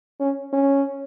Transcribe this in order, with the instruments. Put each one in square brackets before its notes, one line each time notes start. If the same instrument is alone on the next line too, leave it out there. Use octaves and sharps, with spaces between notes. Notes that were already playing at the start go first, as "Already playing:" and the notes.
[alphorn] C#4
C#4